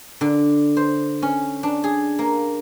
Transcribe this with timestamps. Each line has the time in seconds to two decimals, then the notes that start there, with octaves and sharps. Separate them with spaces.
0.21 D3
0.77 C5
1.22 C#4
1.63 D4
1.84 G#4
2.19 A#3